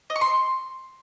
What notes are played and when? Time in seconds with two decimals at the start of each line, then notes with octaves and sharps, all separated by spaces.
0.10 D#5
0.16 C#6
0.21 C6